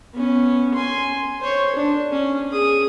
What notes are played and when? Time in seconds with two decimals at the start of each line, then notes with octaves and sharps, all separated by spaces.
0.14 B3 C#4
0.74 G#5 C6
1.41 C5 C#5
1.76 D4
2.11 C#4
2.51 G#4 D#6